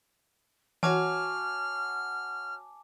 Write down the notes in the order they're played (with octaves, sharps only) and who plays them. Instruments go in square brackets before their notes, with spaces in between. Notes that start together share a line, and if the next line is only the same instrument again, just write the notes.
[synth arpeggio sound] E3 [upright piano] F#4 C#5 [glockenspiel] G#5 A5 D6 [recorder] F6